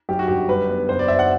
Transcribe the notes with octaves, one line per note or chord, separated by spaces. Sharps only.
F#2 G4
F#4
G1 G4
G2 B4
B3
F#1 C5
D5
F#1 E5
F#5